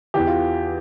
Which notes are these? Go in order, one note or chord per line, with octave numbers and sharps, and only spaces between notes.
E2 E3 G4
F4